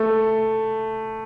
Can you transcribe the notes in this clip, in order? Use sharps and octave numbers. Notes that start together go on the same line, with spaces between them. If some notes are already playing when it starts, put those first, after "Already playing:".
Already playing: A3